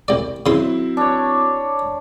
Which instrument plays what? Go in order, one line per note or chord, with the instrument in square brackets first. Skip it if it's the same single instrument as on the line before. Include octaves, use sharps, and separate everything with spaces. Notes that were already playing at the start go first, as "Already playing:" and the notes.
[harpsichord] C2 D5
[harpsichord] C#3 C6 [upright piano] F#3 C4 E4
[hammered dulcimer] D4 C#5